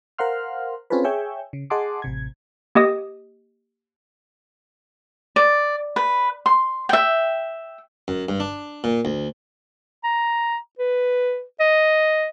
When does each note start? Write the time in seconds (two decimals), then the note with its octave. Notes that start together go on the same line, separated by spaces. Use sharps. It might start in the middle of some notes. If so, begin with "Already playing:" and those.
0.18 A#4 C5 F5 F#5 C6 F6
0.90 C4 C#4 F4 G#4 A4 B4
1.04 G#4 C#5 E5 G5 G#5
1.53 C#3
1.70 G#4 D#5 F#5 A5 C6 D6
2.02 A1 C3 G#6
2.75 A#3 G4 D#5 D#6
5.36 D5
5.96 B4
6.46 C6
6.89 E5 G5
8.08 F#2
8.29 G2
8.40 D4
8.84 A#2
9.05 D2
10.04 A#5
10.79 B4
11.60 D#5